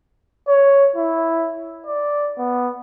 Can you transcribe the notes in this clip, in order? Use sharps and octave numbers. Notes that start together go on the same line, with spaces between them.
C#5
E4
D5
B3